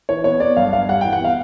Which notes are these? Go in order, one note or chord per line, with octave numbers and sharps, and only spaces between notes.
E3 C#5
B3 C#5
B3 D5
G2 F5
G2 F5
G3 F#5
E3 G5
F#5
B3 F5